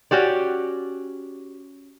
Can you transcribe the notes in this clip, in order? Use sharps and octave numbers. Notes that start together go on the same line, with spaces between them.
C#4 F#4 G4 D5